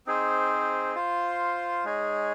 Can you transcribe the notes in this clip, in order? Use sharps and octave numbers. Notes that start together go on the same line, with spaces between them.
C4 D#4 G#4 C5
F4 C5 F5
G#3 D#4 G#4 C#5